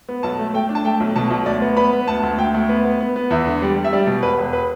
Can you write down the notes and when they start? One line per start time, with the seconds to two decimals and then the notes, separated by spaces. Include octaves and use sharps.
0.08 B3
0.23 B1 A5
0.39 A3
0.54 A3 G5
0.69 D4
0.75 A5
0.85 A3 G5
1.00 B1
1.16 B2 A5
1.31 B1
1.46 D2 D5
1.61 B3
1.77 B3 B5
1.93 B3
2.07 D2 A5
2.23 D2
2.38 D2 G5
2.54 D2
2.69 B3
2.85 B3
3.01 B3
3.16 B3
3.30 E2 E5
3.47 D3
3.62 G3
3.76 G3
3.85 E5
3.93 G3 D5
4.07 B2
4.22 E1 B4
4.38 E1
4.53 B4